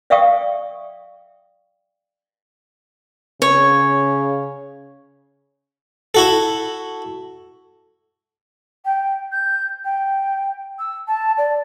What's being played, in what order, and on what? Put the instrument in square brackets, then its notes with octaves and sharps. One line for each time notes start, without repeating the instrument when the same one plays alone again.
[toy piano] D5 E5 F5 G5 C#6 D#6
[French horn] C#3 [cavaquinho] C#5
[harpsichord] E4 F#4 A4
[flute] G5
G6
G5
E6
A5
D5